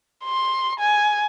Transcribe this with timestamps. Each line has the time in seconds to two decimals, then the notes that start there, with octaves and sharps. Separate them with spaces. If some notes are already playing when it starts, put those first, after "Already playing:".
0.24 C6
0.80 G#5